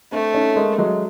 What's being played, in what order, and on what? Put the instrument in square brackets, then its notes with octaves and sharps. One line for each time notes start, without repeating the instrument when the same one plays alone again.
[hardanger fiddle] A3 [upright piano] C4 D4
[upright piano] C#4 D#4
G#3 A#3
F#3 G#3